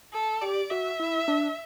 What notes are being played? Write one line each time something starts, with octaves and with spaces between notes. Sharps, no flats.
A4
G4 D5
F#4 E5
E4
D4